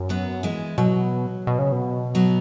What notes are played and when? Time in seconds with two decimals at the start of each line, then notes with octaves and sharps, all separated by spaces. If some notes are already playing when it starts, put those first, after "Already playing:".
Already playing: F#2
0.09 F#3 B3
0.43 E3 G#3
0.78 B2 F#3
1.47 B2
1.59 C#3
1.72 B2
2.15 F#3 B3